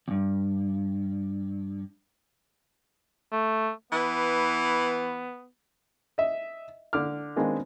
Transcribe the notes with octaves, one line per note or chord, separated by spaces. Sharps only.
E2 G2
A3
E3 B3
D#5 E5
D3 D6 F6
D#3 G#3 B3 C4 D4 F4